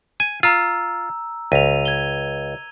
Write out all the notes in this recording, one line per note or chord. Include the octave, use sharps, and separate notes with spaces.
G#5
F4 A#5 E6
C#2 D#7 F7
G#6 G7